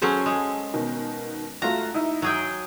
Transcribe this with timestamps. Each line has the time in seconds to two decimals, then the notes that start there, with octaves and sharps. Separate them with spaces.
0.02 F#3 C#4 G#4 A4 C5
0.26 G#3
0.74 B2 D#3
1.62 A3 F4 F#4 A#5
1.94 D#4 E4
2.22 F#3 G#4 G5